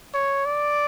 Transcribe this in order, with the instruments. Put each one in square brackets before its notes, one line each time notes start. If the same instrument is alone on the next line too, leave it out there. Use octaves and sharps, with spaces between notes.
[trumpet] C#5
D5